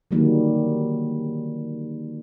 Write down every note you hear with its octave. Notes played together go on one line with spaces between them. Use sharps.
D3 D#3 F#3 G3 A#3